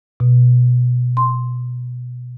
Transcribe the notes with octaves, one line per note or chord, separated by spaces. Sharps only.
B2
C6